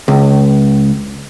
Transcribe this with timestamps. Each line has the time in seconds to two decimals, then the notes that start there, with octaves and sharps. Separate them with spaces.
0.08 C#2